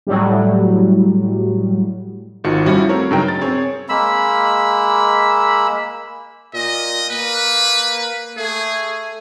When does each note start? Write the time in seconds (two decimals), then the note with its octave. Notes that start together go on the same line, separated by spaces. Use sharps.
0.07 A2 F#3 G3
2.44 G#1 D#3 F4 F#4 C#7
2.66 F3 G3 C#4 E4 F#4
2.89 A3 C4 A#4 C#5
3.11 G2 C#3 F#3 D#4 A#4 G5
3.28 A6
3.41 C4 G#4 C#5
3.89 G#3 A#3 B5 E6
6.54 A#2 D#5
7.10 A#3 B4
8.37 A3 G#4